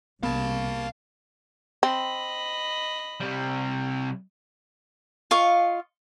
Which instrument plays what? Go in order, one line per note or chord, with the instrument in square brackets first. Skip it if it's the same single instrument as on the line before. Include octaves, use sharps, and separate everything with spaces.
[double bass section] C2 [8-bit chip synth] A#3 A5 [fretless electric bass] B3 [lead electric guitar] F5 B5
[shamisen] C4 [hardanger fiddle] D#5 B5
[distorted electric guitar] C3 G3
[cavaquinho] F4 D#5 F5 C#6